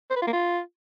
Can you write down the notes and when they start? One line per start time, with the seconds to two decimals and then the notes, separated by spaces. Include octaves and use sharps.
0.11 C5
0.16 B4
0.22 F4
0.27 A#3
0.33 F4